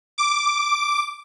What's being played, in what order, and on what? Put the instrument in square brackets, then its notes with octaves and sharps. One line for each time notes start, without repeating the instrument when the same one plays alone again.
[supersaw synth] D6